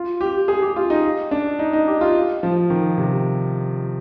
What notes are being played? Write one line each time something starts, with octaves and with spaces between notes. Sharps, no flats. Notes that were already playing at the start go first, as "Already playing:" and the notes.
Already playing: F4
G4
G#4
G4
F4
D#4
D4
D#4
D#4
G4
F4
F3
D#3
C3